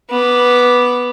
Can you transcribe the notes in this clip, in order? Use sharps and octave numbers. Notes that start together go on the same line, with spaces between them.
B3 D6